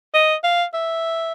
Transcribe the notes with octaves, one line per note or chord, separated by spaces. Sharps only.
D#5
F5
E5